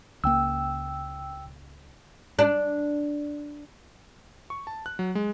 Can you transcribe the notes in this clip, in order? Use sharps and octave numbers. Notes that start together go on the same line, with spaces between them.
C#2 A#3 G5 E6
D4
C#6
A5
F#6
F#3
G#3